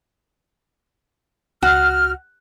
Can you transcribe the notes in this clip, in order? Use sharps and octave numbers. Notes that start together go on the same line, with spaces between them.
C#2 F#4 F6